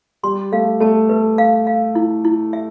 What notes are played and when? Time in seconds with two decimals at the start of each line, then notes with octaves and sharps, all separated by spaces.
0.23 G3 C6
0.52 A3 F5
0.80 A3 A5
1.09 A3 B4
1.38 F5
1.67 F5
1.95 E4
2.25 E4
2.53 E5